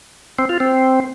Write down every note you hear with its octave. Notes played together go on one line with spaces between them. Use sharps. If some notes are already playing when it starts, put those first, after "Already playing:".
C4
F4
C4